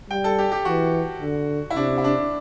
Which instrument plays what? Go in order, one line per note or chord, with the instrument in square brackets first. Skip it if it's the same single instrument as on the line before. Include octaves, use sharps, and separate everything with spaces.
[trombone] G3 [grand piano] G5
[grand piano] A4
G4
G4
[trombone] E3 [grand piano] F#4
[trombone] D3
[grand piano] E4
[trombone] C3 [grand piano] D4
[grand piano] E4
D4